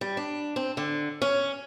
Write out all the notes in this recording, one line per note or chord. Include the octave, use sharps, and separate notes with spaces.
G3
D4
C4
D3
C#4